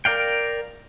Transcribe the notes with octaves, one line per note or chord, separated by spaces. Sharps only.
A#4 D5 F5 G5